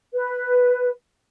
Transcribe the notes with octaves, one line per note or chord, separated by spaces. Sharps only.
B4